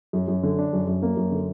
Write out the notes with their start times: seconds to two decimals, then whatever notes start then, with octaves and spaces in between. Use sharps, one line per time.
0.13 F#2
0.28 F#2
0.43 D3
0.58 D4
0.73 F#2
0.87 F#2
1.03 A#3
1.17 F#2
1.32 D3